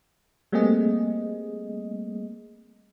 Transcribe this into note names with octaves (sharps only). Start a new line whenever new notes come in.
G3 A3 A#3 C4 G#4 D#5